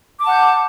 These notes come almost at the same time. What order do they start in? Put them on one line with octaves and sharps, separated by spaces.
D6 A5 F#5 G6